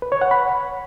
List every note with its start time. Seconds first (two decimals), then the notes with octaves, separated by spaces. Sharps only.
0.02 B4
0.12 C#5
0.21 F#5
0.31 B5